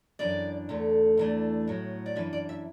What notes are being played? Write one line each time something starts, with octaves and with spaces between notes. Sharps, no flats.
F#2 E3 D4 D5
E2 D3 A3
E2 E3 A3 D4
A2 F#3 B3
D5
F#2 E3 D4 B4
D5
E5